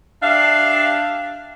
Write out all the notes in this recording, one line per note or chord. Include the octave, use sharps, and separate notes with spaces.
D4 G4 E5 F5